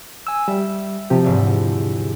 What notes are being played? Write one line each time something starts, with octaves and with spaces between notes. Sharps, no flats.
G#5 E6
G3 E5
C3 F3 G4
E2 G#2 D3